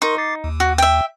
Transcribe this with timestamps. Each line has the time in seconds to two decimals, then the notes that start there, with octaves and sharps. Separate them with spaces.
0.02 D#4 A#4 C6 C#6
0.18 D6 A6 C7
0.44 D#2
0.60 F#4
0.78 E5 G5